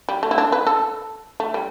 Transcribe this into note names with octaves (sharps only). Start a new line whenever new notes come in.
G3
A3
E4
D4
B4
A4
A3
G3